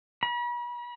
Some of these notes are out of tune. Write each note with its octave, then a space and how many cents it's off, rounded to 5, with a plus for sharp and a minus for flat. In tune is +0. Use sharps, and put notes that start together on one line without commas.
B5 -40